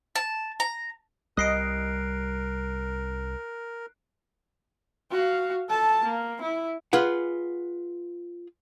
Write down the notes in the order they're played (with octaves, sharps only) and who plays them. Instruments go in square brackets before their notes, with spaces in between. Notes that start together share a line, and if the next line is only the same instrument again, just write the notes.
[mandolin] A5
A#5
[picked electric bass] C2 G3 [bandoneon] A#4 [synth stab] D#5 [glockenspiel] F#6 C7 D7
[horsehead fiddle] F#4 F5
A4 A5
A#3
E4
[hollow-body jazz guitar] F4 G#4 B4 F#5